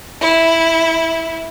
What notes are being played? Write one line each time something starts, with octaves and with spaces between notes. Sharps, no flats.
E4